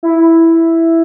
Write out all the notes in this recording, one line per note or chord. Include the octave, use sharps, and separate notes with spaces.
E4